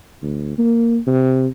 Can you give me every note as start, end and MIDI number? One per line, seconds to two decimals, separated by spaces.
0.23 0.55 38
0.58 0.98 58
1.07 1.47 48